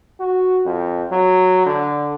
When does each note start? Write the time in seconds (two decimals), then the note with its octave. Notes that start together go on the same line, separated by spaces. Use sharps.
0.20 F#4
0.65 F2
1.11 F#3
1.66 D3